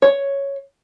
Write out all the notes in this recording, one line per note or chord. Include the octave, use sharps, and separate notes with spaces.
C#5